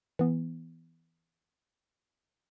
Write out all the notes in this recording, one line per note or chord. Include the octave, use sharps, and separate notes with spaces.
E3 B3